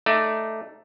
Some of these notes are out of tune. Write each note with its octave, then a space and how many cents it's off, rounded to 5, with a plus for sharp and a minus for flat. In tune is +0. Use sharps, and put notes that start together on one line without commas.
A3 +0 D#4 +0 D5 +0